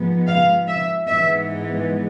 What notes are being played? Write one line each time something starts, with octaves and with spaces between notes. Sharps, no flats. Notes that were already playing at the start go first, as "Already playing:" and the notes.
Already playing: G#2 F3 G#3 B3
F5
E5
G#2 E3 G#3 B3 E5